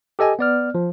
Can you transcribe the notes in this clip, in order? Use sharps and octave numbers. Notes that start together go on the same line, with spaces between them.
G4 A4 D#5 G#5
B3 D5 F6
F3